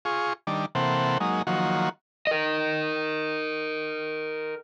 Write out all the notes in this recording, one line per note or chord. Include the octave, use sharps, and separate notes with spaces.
F4 G#4 C#6
D#3 G3 D4
C3 E3 A#3 C4 A4 F#5
F#3 G#3 A#3 D#4
D#3 F3 F#3 A#3 F#4
A#4 D#5